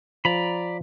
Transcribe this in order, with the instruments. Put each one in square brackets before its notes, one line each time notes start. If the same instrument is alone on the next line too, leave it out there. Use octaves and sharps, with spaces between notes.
[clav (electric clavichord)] F3 [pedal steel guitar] D5 A#5 B5